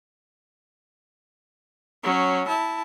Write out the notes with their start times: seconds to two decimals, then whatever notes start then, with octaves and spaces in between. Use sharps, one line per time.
2.04 F#3 C#4
2.47 E4 A5